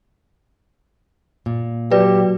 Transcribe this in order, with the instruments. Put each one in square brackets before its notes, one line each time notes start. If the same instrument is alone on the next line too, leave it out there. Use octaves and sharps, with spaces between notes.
[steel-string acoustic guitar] A#2
[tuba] F#3 [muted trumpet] G4 [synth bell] B4 D5